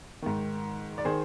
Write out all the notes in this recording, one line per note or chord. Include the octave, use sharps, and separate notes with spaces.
G#2 D#3
D5
D#3 G#4 C5